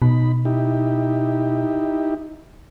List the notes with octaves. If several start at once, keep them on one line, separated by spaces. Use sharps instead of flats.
B2 D#4 B5
D#4 E4 G4